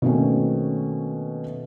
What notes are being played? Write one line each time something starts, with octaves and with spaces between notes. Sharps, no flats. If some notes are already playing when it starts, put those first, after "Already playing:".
B2 D#3 A3 A#3 C4 C#4